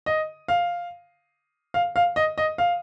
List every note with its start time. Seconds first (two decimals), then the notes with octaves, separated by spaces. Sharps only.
0.06 D#5
0.48 F5
1.74 F5
1.96 F5
2.16 D#5
2.38 D#5
2.58 F5